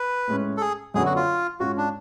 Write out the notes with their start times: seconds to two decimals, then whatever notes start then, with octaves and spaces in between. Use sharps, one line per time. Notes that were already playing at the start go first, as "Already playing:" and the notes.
Already playing: B4
0.28 A2 G#3 C#4
0.57 A4
0.61 G#4
0.94 F#2 D3 F#3 B3 G#4
1.05 F#4
1.16 F4
1.60 G#2 G#3 C#4 F4 F#4
1.77 D4